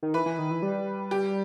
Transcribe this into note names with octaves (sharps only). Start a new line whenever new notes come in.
D#3
E3 B4
E3
D#3
E3
G3
G4